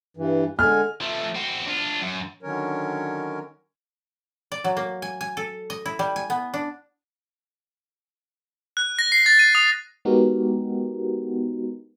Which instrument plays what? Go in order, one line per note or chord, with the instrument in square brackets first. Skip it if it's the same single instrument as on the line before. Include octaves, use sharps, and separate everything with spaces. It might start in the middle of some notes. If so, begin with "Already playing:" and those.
[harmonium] G2 E3
[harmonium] D3 G#3 G#5 [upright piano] F6
[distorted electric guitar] F3 A3
C4 F#4
D4 F4
F#2
[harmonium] D3 D#3 F#3 C#4 A#4 C#5
[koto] D5
F#3
A#3
G#5
G#5
A4
D#5
E4
G3
G#5
B3
D4
[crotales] F#6
A#6
C7
A6
D#7
D#6
[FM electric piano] G#3 B3 D#4 F#4 G4 A#4